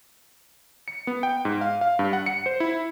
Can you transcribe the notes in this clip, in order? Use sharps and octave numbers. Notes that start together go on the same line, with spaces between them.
C#7
B3
G5
G#2
F5
F5
G2
F#5
C#7
C5
E4